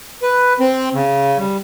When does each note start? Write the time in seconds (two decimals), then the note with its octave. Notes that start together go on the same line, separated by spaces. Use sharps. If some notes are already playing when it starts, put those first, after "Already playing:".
0.22 B4
0.60 C4
0.94 C#3
1.38 G3